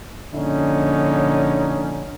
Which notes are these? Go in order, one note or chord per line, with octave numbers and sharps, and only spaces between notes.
A#1 D3 C#4 D#4